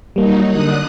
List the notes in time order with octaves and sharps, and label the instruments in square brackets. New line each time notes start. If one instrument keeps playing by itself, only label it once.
[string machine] F#3 D#4 [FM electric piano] G3 A#3
[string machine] D3 D#6 F#6